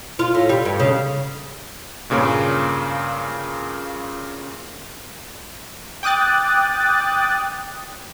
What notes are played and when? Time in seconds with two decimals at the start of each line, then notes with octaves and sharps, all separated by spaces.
0.19 F4
0.35 A2
0.49 G3
0.65 G2
0.80 C#3
2.10 G2 A#2 C#3 A#3 C#4
6.03 G5 D6 D#6 F#6 A6